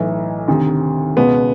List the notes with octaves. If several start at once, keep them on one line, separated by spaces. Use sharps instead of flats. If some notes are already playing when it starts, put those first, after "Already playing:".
Already playing: B1 A2 E3
D2 C3 D#3
C#2 B2 B3